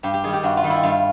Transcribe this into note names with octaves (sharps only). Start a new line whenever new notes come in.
G2 G4
G4
D#3 G3 G#4
G4
G2 F#4
F4
D#3 G3
E4
G2 F4